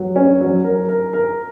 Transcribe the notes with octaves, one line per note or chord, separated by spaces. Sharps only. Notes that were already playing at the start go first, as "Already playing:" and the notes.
Already playing: F#3
C#4
F#3
A#4
A#4
A#4